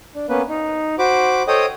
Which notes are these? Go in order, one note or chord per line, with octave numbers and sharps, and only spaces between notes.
D4
A#3 B3 C#4 B4
D#4
F#4 C5 B5 D6
A4 C5 C#5 D#5 G5 D#6